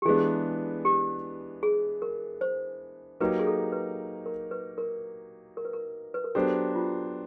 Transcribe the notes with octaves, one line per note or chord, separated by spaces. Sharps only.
G4
E3 G#3 B3 D4 G#4
G4
G#4
A#4
C5
F#3 A#3 D#4 G4 B4
G#4
A4
B4
A#4
B4
A#4
A#4
B4
A#4
B4
A#4
F#3 B3 D4 G4 A4 C5
F4